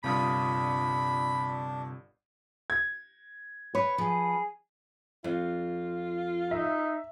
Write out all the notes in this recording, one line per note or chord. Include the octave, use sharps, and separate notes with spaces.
G1 G2 C3 D4 F4 B5 D#6
G#6
B4 C#5
F3 G#4
F2 F4
D#4 E5